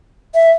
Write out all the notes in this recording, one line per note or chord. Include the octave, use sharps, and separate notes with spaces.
E5